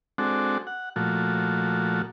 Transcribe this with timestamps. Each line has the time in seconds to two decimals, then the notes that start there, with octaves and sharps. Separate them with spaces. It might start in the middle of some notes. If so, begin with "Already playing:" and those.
0.18 G#3 C4 D4 F#4 A4
0.67 F#5
0.96 A#2 F3 A3 F#4